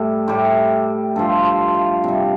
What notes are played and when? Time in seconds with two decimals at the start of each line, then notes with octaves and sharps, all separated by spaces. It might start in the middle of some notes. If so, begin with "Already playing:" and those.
Already playing: A2 G3 A4
0.28 A2 G3 G4
1.16 G2 F3 A4
1.45 C5
1.74 F5
2.04 C3 G3 F5